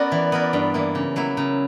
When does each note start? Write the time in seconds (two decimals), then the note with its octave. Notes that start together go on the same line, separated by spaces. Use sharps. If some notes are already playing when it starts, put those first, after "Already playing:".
Already playing: B3 C#4 F#4 A#4 D5
0.12 E3
0.32 B3 E4 A#4
0.53 G2
0.74 E3 A#3
0.95 C#3
1.16 F#3 A#3 E4
1.37 C#3